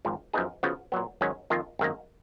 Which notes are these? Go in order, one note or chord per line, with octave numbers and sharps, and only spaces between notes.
G#1 G#2 F3
F#2 F3 B3 D#4 G#4
C#3 F3 B3 F#4
A#2 F#3 B3
G#2 D#3 F#3 C#4 F#4
F2 D#3 A#3 F4
G#1 F#2 D#3 A#3